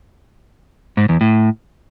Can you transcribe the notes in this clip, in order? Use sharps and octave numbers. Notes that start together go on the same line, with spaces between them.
G#2
E2
A2